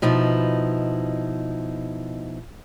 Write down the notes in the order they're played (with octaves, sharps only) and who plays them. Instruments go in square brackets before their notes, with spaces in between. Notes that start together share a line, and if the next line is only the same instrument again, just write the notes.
[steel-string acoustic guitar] B2 F3 D#4 E4